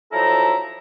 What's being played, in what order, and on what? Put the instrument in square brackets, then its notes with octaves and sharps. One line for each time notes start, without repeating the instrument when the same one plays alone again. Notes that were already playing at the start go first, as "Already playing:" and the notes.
[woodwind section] F3 F#3 D#4 E4 A4 A#5